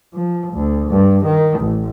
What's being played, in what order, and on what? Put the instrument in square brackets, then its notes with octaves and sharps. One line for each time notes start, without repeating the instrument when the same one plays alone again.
[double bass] F3
D2
G2
D#3
A1